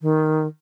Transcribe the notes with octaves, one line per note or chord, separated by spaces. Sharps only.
D#3